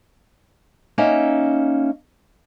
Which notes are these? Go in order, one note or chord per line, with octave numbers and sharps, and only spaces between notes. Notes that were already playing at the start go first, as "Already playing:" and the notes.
A#3 C#4 D#4 E5